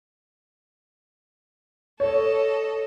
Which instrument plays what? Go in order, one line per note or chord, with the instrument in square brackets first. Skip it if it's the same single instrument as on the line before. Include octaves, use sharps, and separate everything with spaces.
[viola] A4 D#5 [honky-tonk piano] C#5